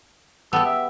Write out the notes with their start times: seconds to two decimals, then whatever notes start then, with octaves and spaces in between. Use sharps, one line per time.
0.53 B3 G4 A4
0.66 E5